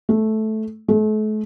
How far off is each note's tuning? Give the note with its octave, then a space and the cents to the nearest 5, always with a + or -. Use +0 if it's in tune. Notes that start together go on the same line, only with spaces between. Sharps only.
A3 -10
A3 -40